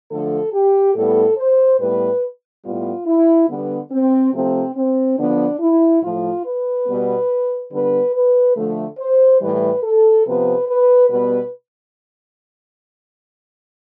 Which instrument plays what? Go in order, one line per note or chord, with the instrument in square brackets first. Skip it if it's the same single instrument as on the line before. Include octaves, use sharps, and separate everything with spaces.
[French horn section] D3 F3 A3 A4
G4
A2 G3 B3 A4
C5
A2 G3 B3 B4
A2 G3 B3 F4
E4
D3 G3 B3
C4
C3 F3 A3 C4
C4
D3 F3 B3 D4
E4
A2 F3 A3 F4
B4
B2 G3 B3
D3 G3 B3 B4
B4
D3 F3 A3
C5
A2 E3 G3 B4
A4
C3 F3 B3 B4
B4
B2 G3 B3 B4